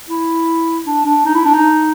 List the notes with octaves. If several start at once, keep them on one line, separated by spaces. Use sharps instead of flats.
E4
D4
D4
D#4
E4
D4
D#4